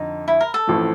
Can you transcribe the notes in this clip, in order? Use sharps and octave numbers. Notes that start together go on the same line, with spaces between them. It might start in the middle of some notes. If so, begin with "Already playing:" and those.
Already playing: F2 D3 D#4
E4
A#4
A4
A1 A2 F3 A3 C4